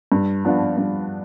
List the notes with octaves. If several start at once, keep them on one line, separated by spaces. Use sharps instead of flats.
G2
F3 B3 D4 F4
G2